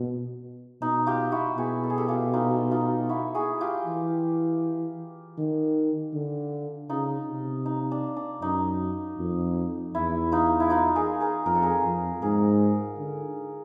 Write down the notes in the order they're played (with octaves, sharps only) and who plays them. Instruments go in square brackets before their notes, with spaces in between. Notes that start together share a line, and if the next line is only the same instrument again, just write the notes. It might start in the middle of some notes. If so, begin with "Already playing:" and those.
Already playing: [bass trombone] B2
[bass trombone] B2 [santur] D#4
[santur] F4 G4
E4 F#4
[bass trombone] B2 [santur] F#4 G#4
[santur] A4
G#4
G4 A4
F4 G4
D#4 F4
D#4 F4
E4 F#4
F#4 G#4
F4 G4
[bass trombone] E3
D#3
D3
[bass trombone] C#3 [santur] D#4 F4
[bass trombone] C3
[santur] D#4
D4
D4
[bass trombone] F#2 [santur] D#4
[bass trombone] F2
[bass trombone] E2 [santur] E4
[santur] D#4 F4
E4
D#4 F4
G#4 A#4
G#4 A#4
[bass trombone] F2 [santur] A#4
[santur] A4
G#4 A#4
[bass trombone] F2
[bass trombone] G#2 [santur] G#4 A#4
[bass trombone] D3